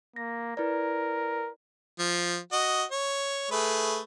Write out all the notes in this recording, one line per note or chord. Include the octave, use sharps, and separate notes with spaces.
A#3 A#6
E4 A#4 B4 D5
F3
F#4 D#5
C#5
A3 G#4 B4